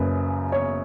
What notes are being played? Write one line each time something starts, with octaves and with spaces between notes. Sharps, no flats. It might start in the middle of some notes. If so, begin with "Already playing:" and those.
Already playing: F#1 F#2 C#3 B4
C#5